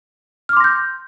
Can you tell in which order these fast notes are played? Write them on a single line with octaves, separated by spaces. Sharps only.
F6 D6 C6 A#6 G6